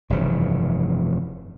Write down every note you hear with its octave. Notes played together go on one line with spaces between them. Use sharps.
F1 G2 C#3 E3